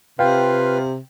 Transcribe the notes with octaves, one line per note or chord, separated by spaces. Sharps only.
C3 F4 B4 F5 G5